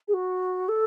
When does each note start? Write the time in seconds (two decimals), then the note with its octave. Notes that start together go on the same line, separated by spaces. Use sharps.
0.08 G#4
0.14 F#4
0.69 A4